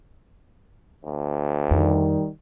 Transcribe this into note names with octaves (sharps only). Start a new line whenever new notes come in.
D2
F2 D#3 G3